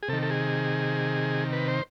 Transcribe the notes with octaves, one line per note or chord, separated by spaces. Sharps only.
G#4
C3 D#3 A4
A4
G#4
B4
C5